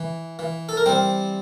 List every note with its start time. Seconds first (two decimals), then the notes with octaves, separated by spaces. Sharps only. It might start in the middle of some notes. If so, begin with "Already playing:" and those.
Already playing: E3
0.39 E3
0.69 A4
0.77 A#4
0.86 G3 C4 C5